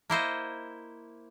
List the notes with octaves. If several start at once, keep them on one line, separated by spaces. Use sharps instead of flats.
A#3 E4 C5 D#5